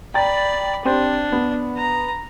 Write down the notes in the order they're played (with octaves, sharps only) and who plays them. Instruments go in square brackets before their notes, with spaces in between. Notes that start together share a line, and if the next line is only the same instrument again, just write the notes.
[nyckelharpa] D5 B5 [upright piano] G5 A#5 A6
[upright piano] C4 G4 C5 [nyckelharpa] D4
[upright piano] B3
[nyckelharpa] A#5